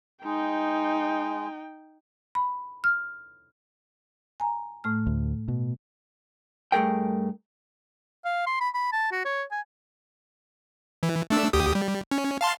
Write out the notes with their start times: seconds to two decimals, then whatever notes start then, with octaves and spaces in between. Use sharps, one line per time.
0.25 G#3 D#4 G5
2.35 B5
2.84 F6
4.40 G#5 A#5
4.84 A2 A3 F6
5.07 D2
5.48 B2
6.72 G2 A3 G#4 A#4 G5
8.25 F5
8.47 C6
8.61 B5
8.74 B5
8.92 A5
9.12 F#4
9.25 C#5
9.51 G#5
11.03 E3
11.30 A3 D4 E6
11.53 D2 G4 D#6
11.75 G3
12.11 C#4
12.41 F5 A5 C6